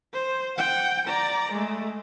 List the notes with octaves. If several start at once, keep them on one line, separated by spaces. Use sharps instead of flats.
C5
F#5 G5
D5 A#5
G#3 A3